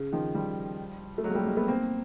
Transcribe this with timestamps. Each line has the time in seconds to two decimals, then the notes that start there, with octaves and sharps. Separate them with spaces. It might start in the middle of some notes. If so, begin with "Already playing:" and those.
Already playing: C#3
0.13 D#3 F3
0.35 F3 G3
1.18 A3
1.24 F#3 G#3
1.30 A#3
1.35 G3 A3
1.46 G#3 A#3
1.57 A3 B3
1.68 A#3 C4